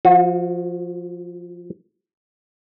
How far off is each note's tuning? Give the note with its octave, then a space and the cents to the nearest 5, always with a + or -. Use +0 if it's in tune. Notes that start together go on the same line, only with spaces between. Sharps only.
F3 +0 F#4 -35